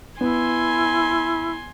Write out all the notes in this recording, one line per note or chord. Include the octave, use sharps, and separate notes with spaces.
B3 E4 G#5 C6